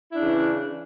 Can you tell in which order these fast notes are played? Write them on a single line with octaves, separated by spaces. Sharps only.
E4 D4 C#3 E3